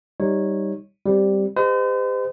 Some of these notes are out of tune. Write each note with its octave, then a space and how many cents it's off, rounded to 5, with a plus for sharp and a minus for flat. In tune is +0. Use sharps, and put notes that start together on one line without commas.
G3 +0 D#4 +0 C#5 -15
G3 +0 C4 +0
G4 +35 C5 -45 D#5 -20